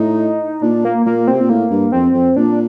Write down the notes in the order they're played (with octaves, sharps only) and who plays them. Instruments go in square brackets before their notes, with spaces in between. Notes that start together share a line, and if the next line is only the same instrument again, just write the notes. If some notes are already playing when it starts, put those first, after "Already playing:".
Already playing: [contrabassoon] A2 [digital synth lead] D#4
[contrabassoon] A#2 [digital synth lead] D4
[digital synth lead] A#3
[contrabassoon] A#2 [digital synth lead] A#3
[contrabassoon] C3 [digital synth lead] C4
[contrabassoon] A#2
[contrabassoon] A2 [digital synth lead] A#3
[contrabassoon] G2
[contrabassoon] F2 [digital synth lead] C4
[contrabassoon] F2
[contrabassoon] A#2 [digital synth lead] D4